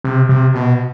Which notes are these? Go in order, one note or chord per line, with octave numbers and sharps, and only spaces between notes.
C3
C3
B2